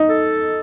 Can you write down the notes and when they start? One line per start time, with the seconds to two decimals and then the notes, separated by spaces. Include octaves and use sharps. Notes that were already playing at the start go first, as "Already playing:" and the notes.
Already playing: D#4
0.09 A4